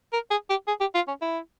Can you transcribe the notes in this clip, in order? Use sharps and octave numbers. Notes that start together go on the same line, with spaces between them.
A#4
G#4
G4
G#4
G4
F4
C#4
E4